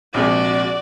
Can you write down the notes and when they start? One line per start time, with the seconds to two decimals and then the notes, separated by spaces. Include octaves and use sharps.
0.14 A#1 C3 G#3 F#4 D5